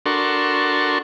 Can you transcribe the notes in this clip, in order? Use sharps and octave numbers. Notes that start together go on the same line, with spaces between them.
D4 F#4 A4 A#4 C6 C#6